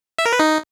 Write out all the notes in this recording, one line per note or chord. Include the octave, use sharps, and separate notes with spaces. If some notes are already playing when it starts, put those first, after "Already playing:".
E5
A#4
B4
D#4